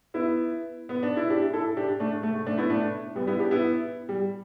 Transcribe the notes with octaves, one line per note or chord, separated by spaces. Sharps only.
B3 E4
B3
D4
E4
D4 G4
E4 A4
D4 G4
A3 D4
A3
A3
A3 D4
B3 E4
A3 D4
G3 B3
B3 E4
D4 G4
B3 E4
G3